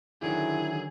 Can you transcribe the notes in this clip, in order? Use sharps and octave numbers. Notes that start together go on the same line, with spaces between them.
D3 D#3 F#3 E4 G#4